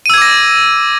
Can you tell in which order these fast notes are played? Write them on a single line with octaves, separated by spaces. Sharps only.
D#7 E6 G#6 D6 A#6